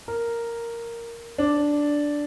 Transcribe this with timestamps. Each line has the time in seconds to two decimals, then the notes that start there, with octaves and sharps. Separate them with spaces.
0.08 A#4
1.38 D4